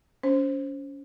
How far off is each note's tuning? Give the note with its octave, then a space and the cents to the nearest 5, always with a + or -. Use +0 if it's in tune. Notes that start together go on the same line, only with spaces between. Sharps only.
C#4 +25 C5 +15